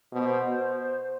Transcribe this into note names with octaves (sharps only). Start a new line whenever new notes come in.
B2 C5